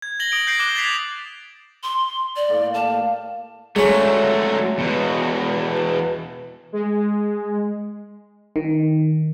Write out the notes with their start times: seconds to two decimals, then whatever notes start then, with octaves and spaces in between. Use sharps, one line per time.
0.02 G#6
0.19 G#6 A#6 F#7 G7
0.32 D#6 A#6 D7
0.47 G6 G#6 A#6 C7 D7
0.59 D6 F#6 E7 G7
0.76 G#6 A6 B6 C7 D7 F7
1.83 C6
2.36 D5
2.49 A2 A#3 C#6
2.74 G4 F5 A5
3.76 F#3 G#3 A3 C#4
4.78 E2 B2
6.72 G#3
8.56 D#3